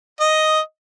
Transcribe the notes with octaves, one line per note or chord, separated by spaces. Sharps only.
D#5